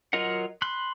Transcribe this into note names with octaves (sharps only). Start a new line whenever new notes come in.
F#3 F4 A#4 D#5 F#5
B5 C6 F#6